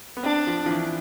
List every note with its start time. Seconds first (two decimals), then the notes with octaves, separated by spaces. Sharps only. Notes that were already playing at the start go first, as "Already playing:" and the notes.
0.17 B3
0.23 C4 D4
0.47 F3
0.66 F3
0.71 E3